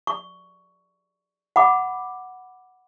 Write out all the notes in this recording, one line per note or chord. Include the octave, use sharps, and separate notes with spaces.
C#6
F#5 B5 D6